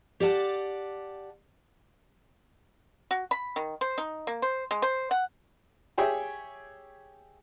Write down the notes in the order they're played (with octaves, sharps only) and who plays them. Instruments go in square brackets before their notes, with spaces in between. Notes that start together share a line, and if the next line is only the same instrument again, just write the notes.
[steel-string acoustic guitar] G4 D5 F#5 A5
[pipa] F#4
B5
D#3
C5
D#4
A#3
C5
G#3
C5
F#5
[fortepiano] G4 G#4 C#5 E5 G5